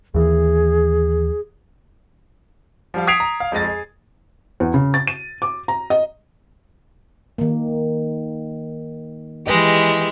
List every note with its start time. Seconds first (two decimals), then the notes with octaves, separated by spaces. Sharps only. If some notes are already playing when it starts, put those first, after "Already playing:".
0.14 D#2 E3 G#4
2.94 F3 G3 F5
3.07 D#6 G#6 B6 C7 D7 F7
3.20 A#5
3.40 F5
3.52 F2 G#3 D#5 A6
3.64 G#4
4.60 E2
4.74 C#3
4.94 A6
5.07 D#7
5.42 D6
5.68 A#5
5.90 D#5
7.38 D#3 A#3
9.47 E3 G#3 G4 B4 D#5